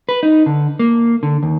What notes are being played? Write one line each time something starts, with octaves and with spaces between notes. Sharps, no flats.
B4
D#4
D3
A#3
D3
D#2